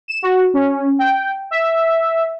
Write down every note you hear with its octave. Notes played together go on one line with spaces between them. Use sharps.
E7
F#4
C#4
G5
E5